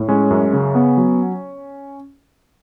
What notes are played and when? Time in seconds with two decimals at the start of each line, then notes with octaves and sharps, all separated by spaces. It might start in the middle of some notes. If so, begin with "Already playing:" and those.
Already playing: A2
0.09 G#3 C#4
0.30 F#2
0.53 C#3
0.75 B3
0.97 F#3